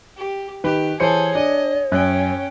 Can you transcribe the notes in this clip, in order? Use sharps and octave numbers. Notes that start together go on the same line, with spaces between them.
G4
D#3 G4 B4
E3 G#4 A4 C5 C#5 C#7
D4 D#5
F#2 C#4 G5 F#6